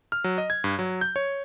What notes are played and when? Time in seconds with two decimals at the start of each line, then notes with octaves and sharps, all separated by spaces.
0.12 F6
0.24 F#3
0.38 D#5
0.50 G#6
0.64 G2
0.79 F#3
1.01 G6
1.16 C#5